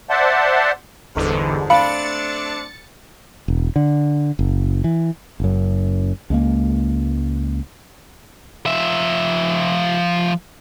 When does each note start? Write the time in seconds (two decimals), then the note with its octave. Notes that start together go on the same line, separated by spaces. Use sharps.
0.10 C5 D5 E5 F#5 A5 C6
1.16 G1 E2 G#2 D3
1.70 A3 C4 D4 F5 B5 A6 C#7
3.48 E1
3.76 D3
4.39 F#1
4.84 E3
5.40 F#1 F#2
6.30 C#2 G#3 A#3
8.66 F3 E5